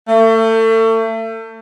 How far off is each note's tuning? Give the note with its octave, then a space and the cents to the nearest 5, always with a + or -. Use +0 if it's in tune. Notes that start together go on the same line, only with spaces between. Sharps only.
A3 +35